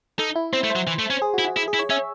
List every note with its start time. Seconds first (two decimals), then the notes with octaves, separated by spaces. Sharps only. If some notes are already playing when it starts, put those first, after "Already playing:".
0.19 D#4 A4
0.35 E4
0.53 C4 C5
0.64 A3
0.70 C5
0.76 F#3
0.87 E3
0.99 A3
1.10 C#4
1.22 G#4
1.34 F#4
1.39 E4
1.44 F#4
1.56 E4 G#4
1.68 G#4
1.74 E4
1.79 C#5
1.90 C#4 E5